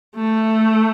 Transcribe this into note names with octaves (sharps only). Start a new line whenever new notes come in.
A3